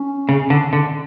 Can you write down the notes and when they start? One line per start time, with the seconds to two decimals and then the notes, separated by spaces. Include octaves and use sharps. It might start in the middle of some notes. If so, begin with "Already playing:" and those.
Already playing: C#4
0.29 C#3
0.50 D3
0.73 D3